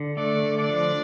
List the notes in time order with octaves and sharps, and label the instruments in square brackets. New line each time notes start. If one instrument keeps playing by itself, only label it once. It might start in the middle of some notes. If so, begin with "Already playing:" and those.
Already playing: [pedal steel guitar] D3
[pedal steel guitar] A3 [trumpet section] D4 D5
[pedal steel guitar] D3
[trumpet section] D4 D5
[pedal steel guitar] F3